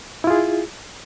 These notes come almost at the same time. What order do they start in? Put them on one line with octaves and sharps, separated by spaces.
E4 F4 G#4